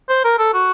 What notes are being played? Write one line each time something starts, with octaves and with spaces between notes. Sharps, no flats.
C5
A#4
A4
F#4